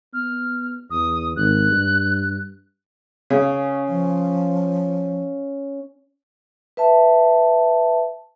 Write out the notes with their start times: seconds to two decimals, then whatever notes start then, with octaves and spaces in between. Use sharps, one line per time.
0.13 B3 F6
0.91 E2 D#6
1.36 G#1 F#6
1.71 G2
3.30 C#3 C#4 F5
3.88 F3
6.77 B4 E5 A5